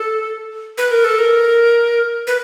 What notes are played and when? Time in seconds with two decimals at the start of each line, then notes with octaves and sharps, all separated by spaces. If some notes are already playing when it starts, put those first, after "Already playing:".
Already playing: A4
0.78 B4
0.91 A#4
1.05 A4
1.19 A#4
2.27 B4